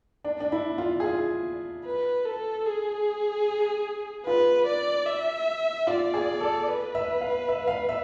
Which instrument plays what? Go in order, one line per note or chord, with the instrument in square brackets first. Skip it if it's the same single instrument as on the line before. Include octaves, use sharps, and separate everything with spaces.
[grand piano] D4
D4
E4
F4
G#4
F4
[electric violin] B4
A4
G#4
[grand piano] F4 [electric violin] B4
[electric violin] D5
E5
[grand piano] F4 [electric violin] D5
[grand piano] G#4
A4
[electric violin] B4
[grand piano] E5
F5
E5
F5
E5